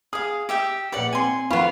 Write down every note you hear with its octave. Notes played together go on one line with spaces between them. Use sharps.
G#4 F5 D#6
G4 E5 G5
A#1 B4 C#5 D5 F#5 C#7
C4 G#5 C6
F2 B3 F4 B5 C#6